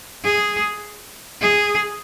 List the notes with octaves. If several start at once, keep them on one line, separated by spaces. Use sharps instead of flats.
G#4
G#4